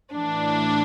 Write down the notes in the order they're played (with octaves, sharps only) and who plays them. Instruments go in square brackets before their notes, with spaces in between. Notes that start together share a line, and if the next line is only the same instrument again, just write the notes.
[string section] A2 E3 D4